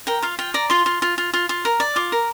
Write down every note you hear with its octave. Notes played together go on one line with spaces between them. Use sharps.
A#4 G5
F4 F5
F4 G5
D5 A#5
F4 C6
F4
F4
F4
F4
F4
A#4
D5
F4 D6
A#4